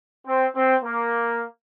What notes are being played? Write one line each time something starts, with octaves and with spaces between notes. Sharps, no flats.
C4
C4
A#3